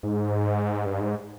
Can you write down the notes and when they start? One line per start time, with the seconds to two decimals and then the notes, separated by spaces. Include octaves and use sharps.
0.03 G#2
0.86 G2
1.01 G#2